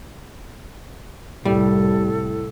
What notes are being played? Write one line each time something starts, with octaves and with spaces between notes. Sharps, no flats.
C2 A2 G3 A4